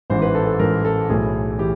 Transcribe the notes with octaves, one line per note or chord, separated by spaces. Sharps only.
A1 G#2 E3 C5
B4
A4
A4
A1 G#2 E3 A#4
A4
B1 A2 E3 G#4
E3 G4